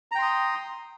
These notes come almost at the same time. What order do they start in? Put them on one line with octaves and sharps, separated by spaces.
A#5 G5 C6 D#6